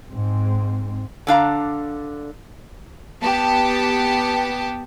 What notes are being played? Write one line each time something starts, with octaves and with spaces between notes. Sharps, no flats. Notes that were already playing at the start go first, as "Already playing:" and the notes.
G#2 C4
D3 D4 F5 A#5
B3 G4 A5